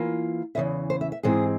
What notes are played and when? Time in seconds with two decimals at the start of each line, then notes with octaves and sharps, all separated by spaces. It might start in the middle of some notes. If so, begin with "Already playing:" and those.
Already playing: E3 A#3 F4
0.55 E2 C#3 E3 E5
0.90 C5
1.01 E5
1.12 E5
1.23 G#2 E3 G#3 C4 G#4